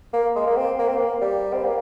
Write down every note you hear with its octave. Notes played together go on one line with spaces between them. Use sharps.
A#3
G#3
A#3
C4
A#3
C4
A#3
G3
C4
A#3